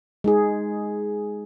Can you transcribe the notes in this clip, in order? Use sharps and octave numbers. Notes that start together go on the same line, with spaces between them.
G#3 D#4 G#4